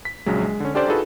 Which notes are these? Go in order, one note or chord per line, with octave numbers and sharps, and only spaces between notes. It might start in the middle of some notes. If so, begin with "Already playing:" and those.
B6
A#1 C#3 F#3 G#3
G#3
D3 C#4
C#4 D4 G4 A4 C5 D5
D#4 F4 F#4 G#4 A4 B4